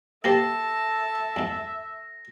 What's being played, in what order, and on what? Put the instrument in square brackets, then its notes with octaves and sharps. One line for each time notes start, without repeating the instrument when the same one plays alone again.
[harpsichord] A#3 G4 C5 [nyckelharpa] A4 A5 [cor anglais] E5 [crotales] A#6
[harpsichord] E2 G#2